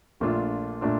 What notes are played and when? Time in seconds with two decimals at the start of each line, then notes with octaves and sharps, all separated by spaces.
0.20 A#1 A#2 A3 D4 F4
0.81 A#2 A3 D4 F4